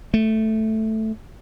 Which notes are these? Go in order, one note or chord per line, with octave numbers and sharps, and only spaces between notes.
A3